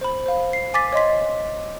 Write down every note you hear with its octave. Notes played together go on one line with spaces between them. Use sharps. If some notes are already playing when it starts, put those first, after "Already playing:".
C5 B5
C5 F5
C7
G#5 D6 A6 B6
C#5 D#5 C6 B6